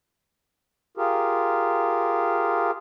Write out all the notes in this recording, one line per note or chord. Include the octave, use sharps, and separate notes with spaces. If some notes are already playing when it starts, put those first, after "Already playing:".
F4 G4 G#4 A#4